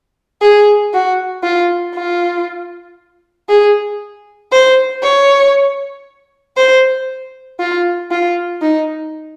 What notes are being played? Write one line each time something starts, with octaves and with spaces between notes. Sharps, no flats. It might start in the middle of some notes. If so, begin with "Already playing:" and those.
G#4
F#4
F4
F4
G#4
C5
C#5
C5
F4
F4
D#4